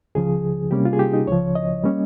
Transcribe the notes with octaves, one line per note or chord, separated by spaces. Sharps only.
C#2 C#3 F3 G#4
C3 G3 A#3 C#4 G4
F4
G#4
G4
D#4
C#2 C#3 F3 C#5
D#5
G3 A#3 C#4